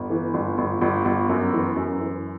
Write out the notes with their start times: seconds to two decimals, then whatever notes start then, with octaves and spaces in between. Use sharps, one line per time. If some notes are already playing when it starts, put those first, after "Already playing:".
Already playing: G1
0.10 E3
0.34 G1
0.58 G1
0.82 G1
1.05 G1
1.29 F#2
1.53 E3
1.76 F#2
2.00 E3